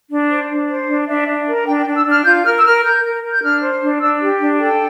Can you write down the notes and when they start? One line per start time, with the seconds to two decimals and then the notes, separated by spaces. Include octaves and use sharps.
0.10 D4
0.29 C5
0.49 D4
0.68 C5
0.88 D4
1.08 D4 E5
1.27 D4
1.47 A#4
1.67 D4 G5
1.81 G5
1.86 D4
1.96 E6
2.05 D4 F6
2.25 F4 G6
2.45 A#4 F6
2.57 E6
2.64 A#4 F6
2.84 A#4 G6
3.03 A#4
3.23 A#4
3.32 G6
3.43 D4 F6
3.62 C5
3.82 D4
4.01 D4 E6
4.21 G4
4.40 D4
4.60 A4 G5